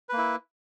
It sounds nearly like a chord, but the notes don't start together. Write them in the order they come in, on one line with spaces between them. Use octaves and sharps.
B4 A#3 E4